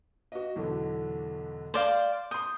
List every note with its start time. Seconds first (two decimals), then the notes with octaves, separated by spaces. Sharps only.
0.32 F#4 B4 D#5
0.56 B1 E2 D3
1.74 C5 D5 F5
2.31 C6 D#6 G6